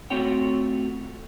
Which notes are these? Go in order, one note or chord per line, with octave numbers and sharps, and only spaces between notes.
A3 C4 F4 F#4 C#5 G5